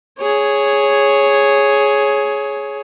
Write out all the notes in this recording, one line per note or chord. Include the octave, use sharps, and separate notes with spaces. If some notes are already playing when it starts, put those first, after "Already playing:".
G#4 C#5